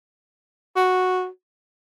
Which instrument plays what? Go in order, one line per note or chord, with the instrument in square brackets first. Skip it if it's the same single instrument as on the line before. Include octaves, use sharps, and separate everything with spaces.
[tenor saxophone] F#4